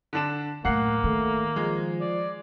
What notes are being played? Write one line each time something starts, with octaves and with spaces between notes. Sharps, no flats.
D3 D4 E7
F#2 A2 A#3 F#5 C7 F#7
D#3 A3
F3 G#3
D5